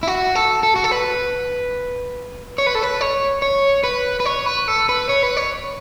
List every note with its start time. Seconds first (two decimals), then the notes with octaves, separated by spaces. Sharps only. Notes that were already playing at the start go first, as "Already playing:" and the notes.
0.03 E4
0.07 F#4
0.35 A4
0.63 A4
0.76 F#4
0.84 A4
0.91 B4
2.58 C#5
2.67 B4
2.75 A4
2.83 B4
3.01 C#5
3.42 C#5
3.84 B4
4.20 B4
4.25 C#5
4.46 B4
4.68 A4
4.89 B4
5.09 C#5
5.23 B4
5.37 C#5